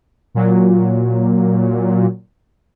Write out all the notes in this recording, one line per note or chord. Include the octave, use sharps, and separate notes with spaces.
A#2 F#3